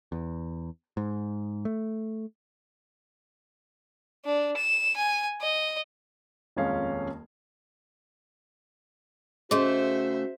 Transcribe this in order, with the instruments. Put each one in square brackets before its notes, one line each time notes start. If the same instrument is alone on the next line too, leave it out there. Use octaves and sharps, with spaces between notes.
[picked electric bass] E2
G#2
A3
[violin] D4
E7
G#5
D#5
[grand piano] D#1 F2 G#3 C#4 F5
[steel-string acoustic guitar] C#3 A3 [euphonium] F#4 [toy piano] G#4 D#5 C6 [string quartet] C5 E5